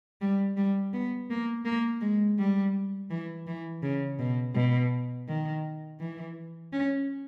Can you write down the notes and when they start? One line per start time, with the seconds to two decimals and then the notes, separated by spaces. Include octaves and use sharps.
0.21 G3
0.57 G3
0.93 B3
1.30 A#3
1.65 A#3
2.01 G#3
2.38 G3
3.10 E3
3.47 E3
3.83 C#3
4.19 B2
4.55 B2
5.28 D#3
6.00 E3
6.72 C#4